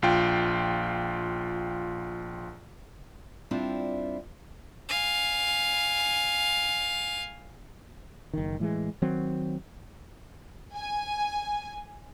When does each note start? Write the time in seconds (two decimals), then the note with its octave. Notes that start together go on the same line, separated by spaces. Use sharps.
0.02 A#1 F4 G5
3.51 G3 C4 D4 E4 F4
4.89 F5 G#5
8.34 F#1 D#3
8.59 A2 E3 G#3
9.02 D#3 F#3 C4
10.74 G#5